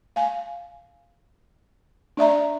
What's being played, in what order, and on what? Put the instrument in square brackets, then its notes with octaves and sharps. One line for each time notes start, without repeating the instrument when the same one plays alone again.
[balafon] F5 G#5
D4 D5 E5 A#5